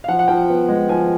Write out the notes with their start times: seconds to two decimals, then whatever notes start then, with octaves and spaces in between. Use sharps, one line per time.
0.04 F5
0.08 F3 F#5
0.19 F#5
0.28 F3 G5
0.49 B3
0.69 G#3
0.89 F3 G#5